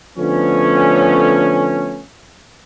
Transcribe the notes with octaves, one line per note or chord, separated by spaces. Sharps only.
D3 F3 A3 B3 C#4